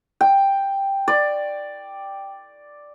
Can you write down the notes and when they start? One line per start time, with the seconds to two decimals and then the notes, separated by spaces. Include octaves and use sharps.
0.21 G5
1.08 D5